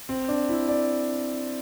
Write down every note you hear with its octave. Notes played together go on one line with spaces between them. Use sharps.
C4
D4
E4
D5